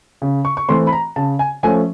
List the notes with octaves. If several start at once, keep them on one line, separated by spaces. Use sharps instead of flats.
C#3
C#6
C#6
E3 A3 C4 C6
B5
A#5
C#3 A5
G#5
F3 A3 C#4 G#5